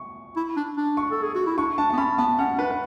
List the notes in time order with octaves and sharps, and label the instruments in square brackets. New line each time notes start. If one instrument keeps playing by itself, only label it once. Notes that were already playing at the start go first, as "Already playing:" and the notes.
Already playing: [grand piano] C#6
[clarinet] E4
D4
D4
[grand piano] C#6
[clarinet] A4
G#4
F#4
E4
[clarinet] D4 [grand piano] C#6
[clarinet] D4 [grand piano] A5
[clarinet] B3 [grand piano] A5
[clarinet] C#4 [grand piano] B5
[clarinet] B3 [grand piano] A5
[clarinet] C#4 [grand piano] F#5
[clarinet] D4 [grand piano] B4
[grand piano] B4